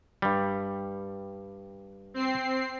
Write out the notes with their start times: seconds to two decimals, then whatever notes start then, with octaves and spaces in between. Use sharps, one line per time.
0.22 G2 G3
2.14 C4 C7